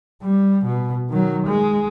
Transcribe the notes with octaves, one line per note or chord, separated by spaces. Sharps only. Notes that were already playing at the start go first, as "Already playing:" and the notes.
G3
B2
D#3 F#3
G#3